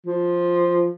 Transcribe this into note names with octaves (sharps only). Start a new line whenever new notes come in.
F3